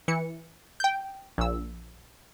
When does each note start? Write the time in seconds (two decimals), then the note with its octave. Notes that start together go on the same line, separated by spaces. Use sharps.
0.08 E3 C#7
0.80 G5 G6
1.38 A#1 E6